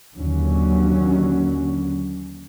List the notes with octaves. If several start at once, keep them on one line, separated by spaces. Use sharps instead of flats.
D#2 D3 F#3 C#4